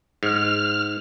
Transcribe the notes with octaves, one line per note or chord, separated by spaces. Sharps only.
G#2 F6